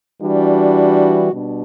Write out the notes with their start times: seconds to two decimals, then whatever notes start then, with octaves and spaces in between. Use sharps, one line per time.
0.21 E3 G3 D4 F#4
1.31 B2 G3 D4